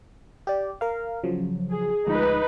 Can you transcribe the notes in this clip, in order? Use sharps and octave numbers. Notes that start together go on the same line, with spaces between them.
G4 D5
A#4 F5
C#3 F3 F#3
G#4
D2 F3 G#3 D#4 B4